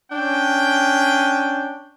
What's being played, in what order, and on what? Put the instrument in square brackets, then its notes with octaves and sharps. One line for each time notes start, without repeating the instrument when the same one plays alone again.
[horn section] C#4 D4 G5